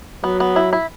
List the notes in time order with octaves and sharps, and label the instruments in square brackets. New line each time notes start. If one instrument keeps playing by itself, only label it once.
[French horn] F#3 [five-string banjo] B3
[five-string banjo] B3
E4
E4